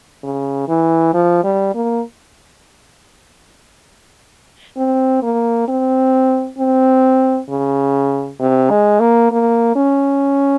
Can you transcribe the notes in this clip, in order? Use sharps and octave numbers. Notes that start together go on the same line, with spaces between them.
C#3
E3
F3
G3
A#3
C4
A#3
C4
C4
C#3
C3
G#3
A#3
A#3
C#4